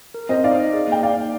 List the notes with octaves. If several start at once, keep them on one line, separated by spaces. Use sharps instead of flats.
A#4
C4 C5 D#5
D#4 D5 F5
D#5
G#4
A#3 G5
D#4 D5 F5
A#3